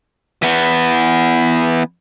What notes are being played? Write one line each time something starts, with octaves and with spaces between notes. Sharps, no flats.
E3 B3